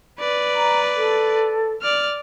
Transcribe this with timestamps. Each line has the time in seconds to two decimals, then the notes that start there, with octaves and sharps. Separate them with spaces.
0.20 B4 D5
0.55 A#5
0.95 A4
1.82 D5 F6